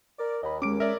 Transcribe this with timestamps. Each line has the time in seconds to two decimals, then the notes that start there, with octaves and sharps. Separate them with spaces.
0.19 A#4 D5
0.43 D#2 D#5 B5
0.62 G#3 C#4 D6 D7
0.80 A#4 C#5 D5 E5